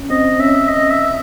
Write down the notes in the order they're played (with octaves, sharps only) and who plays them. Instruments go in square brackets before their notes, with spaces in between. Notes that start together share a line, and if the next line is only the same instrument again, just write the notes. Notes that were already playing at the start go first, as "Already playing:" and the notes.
Already playing: [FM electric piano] C#4
[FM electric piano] C4 [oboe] D#5
[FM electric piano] C#4 [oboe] E5
[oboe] D#5
E5